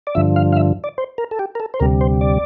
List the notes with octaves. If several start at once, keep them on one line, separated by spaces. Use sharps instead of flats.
D5
G2 D3 F3 E5
F5
F5
E5
D5
C5
A#4
A4
G4
A#4
A4
C5
D2 C3 G3 A#4
C5
D5